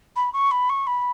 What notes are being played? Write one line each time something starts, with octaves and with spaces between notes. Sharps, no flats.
B5
C#6
B5
C#6
B5